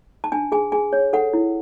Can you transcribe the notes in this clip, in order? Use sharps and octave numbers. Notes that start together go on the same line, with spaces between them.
A5
D4 G#5
G#4 G#5
G#4 G#5
C#5
A4 F#5
E4